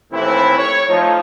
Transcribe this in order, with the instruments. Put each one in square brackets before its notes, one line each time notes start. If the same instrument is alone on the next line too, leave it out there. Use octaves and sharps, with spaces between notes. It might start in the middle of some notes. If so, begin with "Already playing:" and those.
[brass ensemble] D#2 A2 E3 C4 E4
C#5
F3 A3 D#4